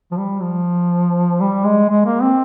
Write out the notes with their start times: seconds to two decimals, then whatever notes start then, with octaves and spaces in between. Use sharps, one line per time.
0.12 F3
0.18 G3
0.42 F3
1.40 G3
1.65 G#3
1.89 G#3
2.06 A#3
2.22 C4